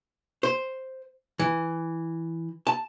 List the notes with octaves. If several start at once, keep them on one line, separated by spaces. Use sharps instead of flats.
C5
E3
A5